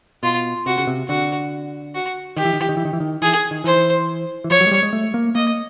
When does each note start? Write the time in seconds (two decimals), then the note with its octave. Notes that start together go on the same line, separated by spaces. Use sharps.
0.23 B2 F4
0.66 C3 F#4
0.78 C#3
0.87 C3
1.08 D3 F#4
1.94 F#4
2.36 D#3 G4
2.45 E3
2.53 D#3
2.60 E3
2.69 D#3
2.77 E3
2.85 D#3
2.93 E3
3.00 D#3
3.22 E3 G#4
3.51 D#3
3.64 E3 C5
4.44 E3
4.50 F3 C#5
4.61 F#3
4.67 G#3
4.71 G3
4.83 G#3
4.93 A3
5.14 A#3
5.35 A#3 D#5